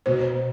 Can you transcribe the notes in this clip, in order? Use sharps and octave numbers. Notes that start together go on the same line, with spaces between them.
B2 C5